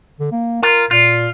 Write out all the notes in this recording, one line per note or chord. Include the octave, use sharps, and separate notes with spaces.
D3
A#3
F4 A#4
A#2 F4